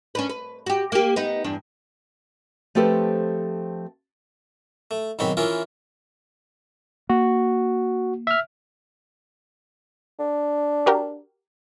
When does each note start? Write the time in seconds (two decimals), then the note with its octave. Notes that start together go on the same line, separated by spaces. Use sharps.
0.15 C#4 D4 B4
0.29 B4
0.66 F#4 G4
0.92 A#3 G4
1.16 B3 D#4 B4
1.44 E2 G2 D4
2.75 F3 A3 C4 G4 A4 B4
4.91 A3
5.19 B1 G#2 D#3 C4 C#5 B5
5.37 E3 C#4 E4 F4 A#4
7.10 A#3 F#4
8.27 E5 F6
10.19 D4
10.86 F#4 G4 A#4